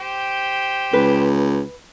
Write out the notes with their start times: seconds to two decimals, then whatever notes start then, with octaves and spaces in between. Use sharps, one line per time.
0.01 G4 C5 G5
0.93 C#2 B4